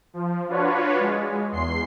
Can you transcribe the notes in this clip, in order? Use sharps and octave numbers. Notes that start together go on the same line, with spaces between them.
F3
D4 F4 F#4 B4 C#5
G#3
E2 C6 C7